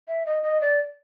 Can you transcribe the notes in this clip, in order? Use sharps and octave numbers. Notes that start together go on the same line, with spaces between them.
E5
D#5
D#5
D5